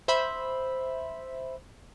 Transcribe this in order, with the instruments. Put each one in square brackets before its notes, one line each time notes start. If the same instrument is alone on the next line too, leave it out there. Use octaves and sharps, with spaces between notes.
[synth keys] C5 E5 B5